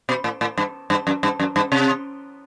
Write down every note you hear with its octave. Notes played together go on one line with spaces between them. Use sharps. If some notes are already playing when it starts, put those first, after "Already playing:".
B2
A2
A2
G2
G2
F#2
G2
F#2
G2
C3